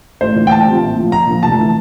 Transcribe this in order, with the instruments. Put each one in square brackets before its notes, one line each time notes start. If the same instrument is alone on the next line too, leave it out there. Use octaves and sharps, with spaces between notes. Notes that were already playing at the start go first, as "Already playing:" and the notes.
[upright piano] A1 [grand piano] C5
[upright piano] A2 E3 A#3 D4
[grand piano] G5
[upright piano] A2 [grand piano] A5
[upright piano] E3 G3 C4 F4
A#1
A2 F3
[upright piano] A#1 [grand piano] A#5
[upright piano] A#2 F3
[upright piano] F1 [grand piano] A5
[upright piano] E3 A3